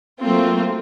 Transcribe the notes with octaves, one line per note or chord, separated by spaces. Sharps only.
F#3 A3 A#3 C4 F4